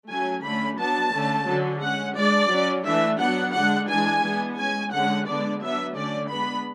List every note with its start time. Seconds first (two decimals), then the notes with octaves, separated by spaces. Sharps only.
0.10 F#3 A3 C#4 G#5
0.44 D3 A3 C#4 B5
0.78 F#3 B3 D4 A5
1.13 D3 A3 C#4
1.47 D3 F#3 C#4
1.82 G#3 C#4 F#5
2.16 G#3 D4 D5
2.51 F#3 C#4
2.85 E3 A3 D4 E5
3.20 F#3 B3 D4 F#5
3.54 D3 G#3 D4 F#5
3.89 E3 G#3 D4 G#5
4.24 E3 G#3 B3 D4
4.58 G#3 C#4 G#5
4.92 D3 G#3 C#4 F#5
5.27 D3 G#3 B3 D4 D5
5.61 F#3 B3 D4 E5
5.96 D3 A3 C#4 D5
6.30 G#3 B3 D4 B5